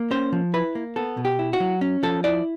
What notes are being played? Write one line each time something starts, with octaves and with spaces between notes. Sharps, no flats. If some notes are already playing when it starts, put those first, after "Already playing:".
Already playing: A#3
C#4 C5
F3
E4 B4
A#3
B3 A4
B2
G4
E4
F#4
F#3
C#4
F3 A4
E4 D5